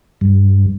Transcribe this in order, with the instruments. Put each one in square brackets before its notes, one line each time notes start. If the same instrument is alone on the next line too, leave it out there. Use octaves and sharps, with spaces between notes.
[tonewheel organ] G2